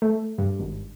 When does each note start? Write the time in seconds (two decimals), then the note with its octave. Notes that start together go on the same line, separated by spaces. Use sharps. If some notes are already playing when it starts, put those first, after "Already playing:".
0.02 A3
0.38 G2
0.60 G#1